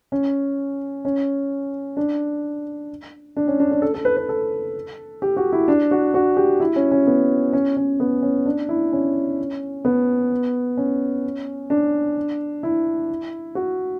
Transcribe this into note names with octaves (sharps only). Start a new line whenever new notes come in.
C#4
C#4
D4
D4
C#4
D4
D4
A4
A4
B4
B4
A4
G4
F#4
E4
D4
F#4
F#4
G4
E4
C#4
C#4
B3
C#4
C#4
B3
C#4
D4
E4
C#4
B3
C#4
D4
E4
F#4